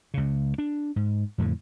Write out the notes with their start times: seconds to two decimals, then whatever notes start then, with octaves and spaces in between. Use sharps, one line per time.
0.14 C#2 C#3
0.58 D4
0.96 G#2
1.38 F2 A2 D3